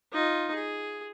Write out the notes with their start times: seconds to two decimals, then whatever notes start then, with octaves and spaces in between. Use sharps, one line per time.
0.12 D#4 F4
0.54 G#4